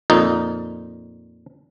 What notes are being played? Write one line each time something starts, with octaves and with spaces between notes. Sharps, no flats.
F2 A#2 D#4